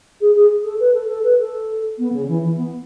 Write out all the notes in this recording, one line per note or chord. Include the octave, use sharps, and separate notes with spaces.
G#4
G#4
A4
B4
A4
A4
B4
A4
B3
C#3
E3
E3
B3